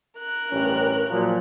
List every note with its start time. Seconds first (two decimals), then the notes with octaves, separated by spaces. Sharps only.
0.18 A#4 F#6
0.51 A1 G2 C#4
1.09 A#2 F3 F#3